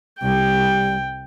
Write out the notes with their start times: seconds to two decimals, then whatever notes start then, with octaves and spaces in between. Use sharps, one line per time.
0.22 C2 G3 G5